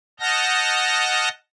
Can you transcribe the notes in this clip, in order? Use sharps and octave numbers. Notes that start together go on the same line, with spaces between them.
D#5 F#5 A5 F6 G6 A#6